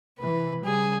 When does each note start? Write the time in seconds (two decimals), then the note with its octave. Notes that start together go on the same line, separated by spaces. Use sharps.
0.19 C3 E3 B4
0.64 C#3 G3 G#4